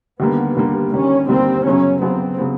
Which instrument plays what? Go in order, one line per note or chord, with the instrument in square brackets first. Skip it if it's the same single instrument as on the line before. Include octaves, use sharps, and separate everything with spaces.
[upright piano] D#2 D3 G3 A#3 [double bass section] B3
[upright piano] D#2 D3 G3 A#3
[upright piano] D#2 D3 G3 A#3 [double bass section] C#4
[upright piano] D#2 D3 G3 A#3 [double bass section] C4
[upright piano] F#2 C#3 F#3 B3 [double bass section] C#4
[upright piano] F#2 C#3 F#3 B3 [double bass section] C4
[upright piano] C#3 F#3 B3